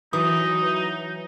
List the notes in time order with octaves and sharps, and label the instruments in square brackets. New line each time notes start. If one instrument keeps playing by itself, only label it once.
[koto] E3 [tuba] F#3 [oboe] D#4 [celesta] D#6